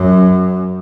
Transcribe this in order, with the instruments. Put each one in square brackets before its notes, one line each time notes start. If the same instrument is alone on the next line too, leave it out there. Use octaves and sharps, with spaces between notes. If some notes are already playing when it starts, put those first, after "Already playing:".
Already playing: [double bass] F#2